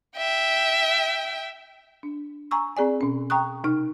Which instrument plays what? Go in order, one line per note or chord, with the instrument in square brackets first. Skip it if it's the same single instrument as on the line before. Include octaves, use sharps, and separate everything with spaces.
[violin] E5 G5
[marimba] D4
G#5 A#5 C#6 E6
C4 G#4 D5 G#5
B2 C#4
G5 A#5 C#6 D#6 F#6
C3 D#4 F6